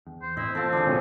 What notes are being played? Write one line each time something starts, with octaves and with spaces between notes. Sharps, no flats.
E2
C5
A2 C4 E4 D#5
E2 F3 C4 A4
D3 D4 G#4
A1 F2 B2 D3 F3